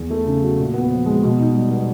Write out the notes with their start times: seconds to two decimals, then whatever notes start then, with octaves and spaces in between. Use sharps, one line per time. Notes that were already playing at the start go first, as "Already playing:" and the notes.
Already playing: E2
0.10 A3
0.26 C#3
0.42 F#3
0.58 A#2
0.74 B3
0.91 F3
1.06 G#3
1.23 B2
1.39 D#4
1.55 G3
1.71 B3